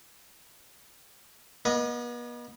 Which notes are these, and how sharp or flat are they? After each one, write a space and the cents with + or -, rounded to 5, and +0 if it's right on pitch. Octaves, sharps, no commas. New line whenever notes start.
B3 -40 D#5 +0